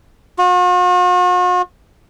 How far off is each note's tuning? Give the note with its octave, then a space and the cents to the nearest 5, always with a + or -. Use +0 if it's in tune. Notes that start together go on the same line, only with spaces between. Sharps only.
F#4 -45